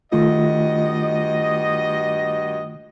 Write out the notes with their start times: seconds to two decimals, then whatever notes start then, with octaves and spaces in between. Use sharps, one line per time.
0.12 G2 D#3 A3 F4 F#4 D#5